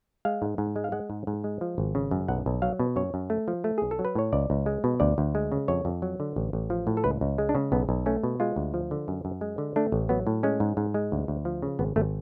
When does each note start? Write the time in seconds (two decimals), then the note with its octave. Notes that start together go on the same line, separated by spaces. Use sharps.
0.25 G#3 F5
0.42 G#2
0.58 G#2
0.76 G#3
0.84 F5
0.92 G#3 F#5
1.10 G#2
1.27 G#2
1.44 G#3
1.61 F3
1.78 G#1
1.95 C#3
2.11 F#2
2.28 B1 F#5
2.46 B1
2.62 F#3 F5
2.79 B2
2.96 F#2 C#5
3.14 F#2
3.30 A3
3.48 F3
3.64 A3
3.78 B1 G#4
3.91 A4
3.99 F#3
4.05 B4
4.15 A2 C#5
4.33 C#2 D5
4.50 C#2
4.66 G#3
4.84 B2
5.00 D2 D5
5.18 D2
5.35 G#3
5.52 C#3
5.68 F2 C#5
5.85 F2
6.02 F#3
6.20 D3
6.36 A1
6.53 A1
6.70 F3
6.87 A2
6.97 A4
7.04 C#2 B4
7.21 C#2
7.38 G#3
7.49 D4
7.55 C#3
7.72 B1 B3
7.89 B1
8.06 A3 C#4
8.23 B2
8.40 G#3 F4
8.56 D2
8.74 F3
8.91 D3
9.08 F#2
9.25 F#2
9.41 G#3
9.58 D3
9.76 A3 D4
9.92 A1
10.09 F#3 B3
10.27 A2
10.43 G#3 C#4
10.60 G#2
10.77 G#2
10.94 G#3
11.12 D2
11.28 D2
11.45 F3
11.62 C#3
11.79 G#1 B3
11.96 G#1 A3